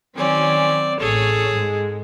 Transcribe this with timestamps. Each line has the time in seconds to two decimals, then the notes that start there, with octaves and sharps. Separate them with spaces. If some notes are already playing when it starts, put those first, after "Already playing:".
0.16 D#3 F#3 C4 C#4 D5
1.00 A1 G#4 A4 C#5
1.54 G#2 G#3